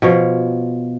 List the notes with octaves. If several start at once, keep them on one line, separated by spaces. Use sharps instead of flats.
B2 F3 C#5